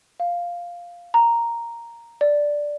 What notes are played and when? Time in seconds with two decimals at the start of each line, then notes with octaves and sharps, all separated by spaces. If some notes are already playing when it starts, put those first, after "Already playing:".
0.20 F5
1.14 A#5
2.21 D5